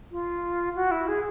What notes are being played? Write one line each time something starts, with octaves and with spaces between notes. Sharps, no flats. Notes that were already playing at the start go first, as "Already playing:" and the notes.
F4
F#4
E4
G#4